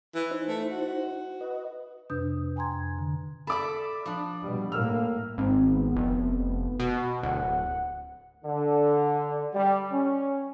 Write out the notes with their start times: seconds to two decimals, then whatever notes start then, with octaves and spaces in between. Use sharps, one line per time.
0.15 E3
0.31 D#4 E4 C5
0.48 A3
0.71 F#4
1.41 B4 D#5
2.10 F2 C3 D4 B4 D#6 G6
2.56 G5 G#5 A#5 C6 G#6
2.75 F2
2.98 D3
3.47 A4 D5 E5 B5 D6
4.06 F3 D4
4.42 B2 G3
4.72 A2 A#3 E6 F6
5.38 G#1 C4
5.75 B3
5.96 F1
6.80 B2
7.23 D1 F#5
8.45 D3
9.54 G3
9.92 C#4